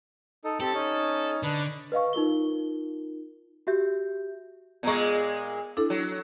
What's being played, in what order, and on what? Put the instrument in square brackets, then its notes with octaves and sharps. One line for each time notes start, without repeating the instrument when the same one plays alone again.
[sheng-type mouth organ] D#4 A4
[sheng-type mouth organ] C4 G4 A5 [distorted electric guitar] A4
[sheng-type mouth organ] C#4 D#4
[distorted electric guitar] D3 [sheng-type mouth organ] D4 B4
[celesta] B4 D#5 F5 C#6
D#4 F4 A#4 G7
F#4 G4 E5 G6
[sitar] A#2 G#3 [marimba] B3 A#5 C#6
[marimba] D4 E4 A4
[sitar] F#3